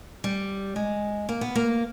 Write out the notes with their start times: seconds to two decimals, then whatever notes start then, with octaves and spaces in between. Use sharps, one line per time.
0.24 G3
0.76 G#3
1.29 A#3
1.41 B3
1.55 A#3